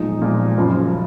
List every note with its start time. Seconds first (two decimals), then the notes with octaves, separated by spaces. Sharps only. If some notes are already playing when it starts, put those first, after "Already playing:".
Already playing: B1 A#2 F3 G#3 D#4
0.22 B1 A#2 F3 G#3
0.58 F#1 F#2 F3 F4